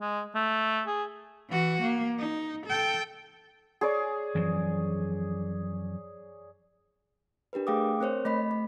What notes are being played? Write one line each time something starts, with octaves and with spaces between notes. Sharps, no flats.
G#3
A3
G#4
E3 F#4
A#3
D#4
A4 G5
G#4 C#5 D5
F#2 E3 F3
D4 G4 A#4 B4
A3 G#4 F5 G5 D6 D#6
C4 A#4 C5 C#5
A3 D#5 B5 B6
A3